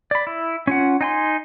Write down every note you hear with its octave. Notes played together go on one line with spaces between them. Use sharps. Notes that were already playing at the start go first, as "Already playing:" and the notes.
D5 B5
E4
C#4 F4 F#5
D#4 G#5 C6